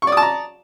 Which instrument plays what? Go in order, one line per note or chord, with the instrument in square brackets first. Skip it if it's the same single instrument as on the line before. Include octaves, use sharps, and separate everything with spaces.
[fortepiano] C#6
D5
D#6
A5
A#5